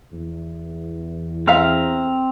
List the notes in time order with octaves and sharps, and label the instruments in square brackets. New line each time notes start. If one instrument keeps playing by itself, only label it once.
[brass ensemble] E2
[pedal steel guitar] C4 A#5 F6 [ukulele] A4 E5 F5